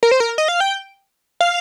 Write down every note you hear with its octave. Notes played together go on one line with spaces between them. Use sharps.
A#4
C5
A#4
D#5
F5
G5
F5